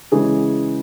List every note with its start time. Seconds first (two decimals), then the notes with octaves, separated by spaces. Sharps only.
0.12 C#3 E3 G#3 G#4